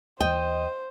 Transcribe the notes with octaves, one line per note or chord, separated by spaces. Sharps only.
D#2 E3 C5 D#5 G5